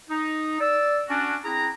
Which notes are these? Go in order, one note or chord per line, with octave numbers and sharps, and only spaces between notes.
D#4
D5 E6
C#4 D4 F#4
C4 E4 G#4 A#5